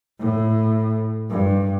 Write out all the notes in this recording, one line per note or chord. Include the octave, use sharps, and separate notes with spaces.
A2
G2